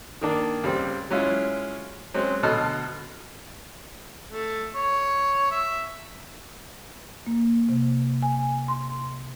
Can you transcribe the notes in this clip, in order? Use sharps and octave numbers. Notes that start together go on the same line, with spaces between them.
D#3 A#3 D4
C#2 G3 C4
F#3 G#3 C#4 E4 F4
F#3 G#3 C4 C#4
D2 B2 A4 D#5 F6
A3
C#5
E5
A#3
C3
G#5
C6